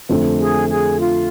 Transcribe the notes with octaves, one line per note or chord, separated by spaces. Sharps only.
F2 D3 A3
G#4
G#4
F4